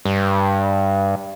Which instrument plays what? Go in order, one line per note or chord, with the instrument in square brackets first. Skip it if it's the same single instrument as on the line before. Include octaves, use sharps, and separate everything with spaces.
[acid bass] G2